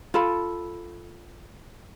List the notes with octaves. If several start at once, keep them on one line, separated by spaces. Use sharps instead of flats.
F4 A4 B5